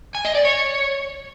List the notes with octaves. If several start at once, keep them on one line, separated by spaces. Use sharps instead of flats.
G#5
D#5
D5
C#5